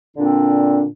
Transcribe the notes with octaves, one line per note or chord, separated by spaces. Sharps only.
A#2 D3 C4 D4